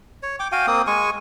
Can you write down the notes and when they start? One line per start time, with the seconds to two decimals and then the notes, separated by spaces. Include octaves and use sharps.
0.23 C#5
0.39 G5 D6
0.52 F#4 F5 G5 G#5
0.67 A#3 C4 D#6
0.87 G#3 G#5 C#6